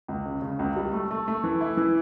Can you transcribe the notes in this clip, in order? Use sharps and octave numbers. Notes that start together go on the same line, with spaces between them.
C#2
C#3
C#3
C#2
G3
A3
A3
A3
E3
E4
E3